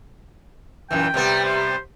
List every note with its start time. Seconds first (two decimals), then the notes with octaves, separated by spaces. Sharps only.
0.91 F#2 A#2 E3 G5
1.14 C3 G3 B3
1.45 C5